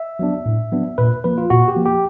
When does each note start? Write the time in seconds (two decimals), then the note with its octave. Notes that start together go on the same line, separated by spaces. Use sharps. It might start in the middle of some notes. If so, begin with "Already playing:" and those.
Already playing: E5
0.19 F#3 B3 D4
0.46 A2
0.72 F#3 B3 D4
0.98 A#2 B4
1.24 F3 A#3 B4
1.38 F4
1.50 A#2 F#4
1.68 G4
1.76 F3 A#3
1.86 G4